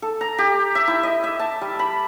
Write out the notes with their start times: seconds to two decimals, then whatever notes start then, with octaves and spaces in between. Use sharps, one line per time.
0.02 A4
0.21 A#5
0.38 G4
0.75 E5
0.87 E4
1.03 D#5
1.24 E5
1.39 A5
1.61 G3
1.79 B5